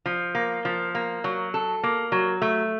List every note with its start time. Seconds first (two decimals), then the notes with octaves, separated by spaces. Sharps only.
0.06 F3
0.35 A#3
0.65 F3
0.95 A#3
1.24 F#3
1.54 A4
1.83 A#3
2.12 F#3
2.42 A3